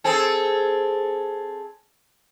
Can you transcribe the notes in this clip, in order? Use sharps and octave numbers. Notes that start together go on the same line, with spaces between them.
C4 G#4 A4